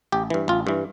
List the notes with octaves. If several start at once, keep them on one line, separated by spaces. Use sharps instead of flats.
A1 G4
G2 E3
A1 F4
G2 E3